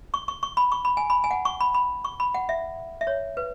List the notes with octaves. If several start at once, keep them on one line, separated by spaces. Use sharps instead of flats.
C#6
C#6
C#6
B5
C#6
B5
G#5
B5
G#5
F#5
C#6
B5
B5
C#6
B5
F#5
E5
E5
C#5
B4